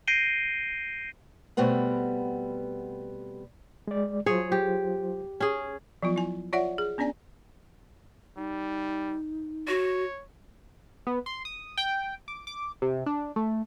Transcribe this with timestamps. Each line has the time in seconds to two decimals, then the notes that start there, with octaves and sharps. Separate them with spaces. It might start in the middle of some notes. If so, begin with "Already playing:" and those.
0.07 G6 A#6 C7 D7 D#7 G7
1.57 B2 G3 A3 B3 C4
3.88 G#3 D5
4.26 F#3 F4 G#4 C5 C#5
4.52 G4
5.40 C#4 G#4
6.03 F3 F#3 B3 F4
6.16 E4 G#5
6.53 F4 C#5 D5 E5 F#5
6.78 G#4
6.98 B3 C#4 D4 D5 G#5
8.37 G3 D#4
9.68 F#4 C#5
11.07 B3
11.26 C6
11.45 D#6
11.77 G5
12.28 D6
12.47 D6
12.82 C3
13.06 D4
13.36 A3